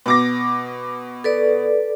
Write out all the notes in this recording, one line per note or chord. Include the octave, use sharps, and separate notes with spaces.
B2 D6 A#6
A4 B4 D5